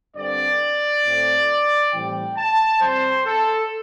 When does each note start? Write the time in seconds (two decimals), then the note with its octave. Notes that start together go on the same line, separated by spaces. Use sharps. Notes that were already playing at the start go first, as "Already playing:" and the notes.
0.16 G2 D3 C4 D5
1.04 A2 A3 C4
1.92 A2 E3 G3 C4 G5
2.36 A5
2.80 C3 G3 C4 C5
3.25 A4